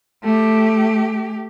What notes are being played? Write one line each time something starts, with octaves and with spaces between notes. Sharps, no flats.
A3 G4